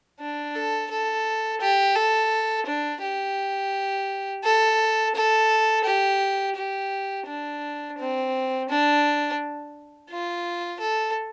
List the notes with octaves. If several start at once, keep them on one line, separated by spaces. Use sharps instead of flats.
D4
A4
A4
G4
A4
D4
G4
A4
A4
G4
G4
D4
C4
D4
F4
A4